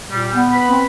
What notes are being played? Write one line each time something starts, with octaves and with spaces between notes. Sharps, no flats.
A#2 G3
B3
B4 B5
C4